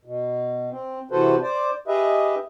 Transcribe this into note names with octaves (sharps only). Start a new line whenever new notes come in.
B2
C4
C3 E3 F#4 A4 B4 C5
C5 D5
G4 G#4 B4 D#5 E5